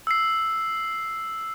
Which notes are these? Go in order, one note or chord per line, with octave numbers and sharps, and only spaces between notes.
E6 C7